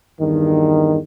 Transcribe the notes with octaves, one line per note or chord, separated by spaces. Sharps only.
E2 G2 D#3